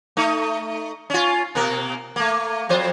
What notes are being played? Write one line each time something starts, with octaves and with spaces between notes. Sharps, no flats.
A3 D#4
C#4 F4
B2 A#3 A#4
A3 A#3
F2 F3 C5